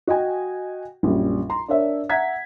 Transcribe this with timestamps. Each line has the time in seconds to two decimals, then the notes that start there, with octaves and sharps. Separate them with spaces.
0.07 F#4 D#5 G5 G#5
1.03 A#1 F#2 G3
1.49 A#5 C6
1.68 D4 A#4 C#5 E5
2.09 E5 F#5 A#5 G#6 B6